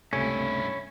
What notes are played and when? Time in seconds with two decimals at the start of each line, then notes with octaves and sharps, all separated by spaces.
0.13 C#2 G2 C3 A3 C#4 E4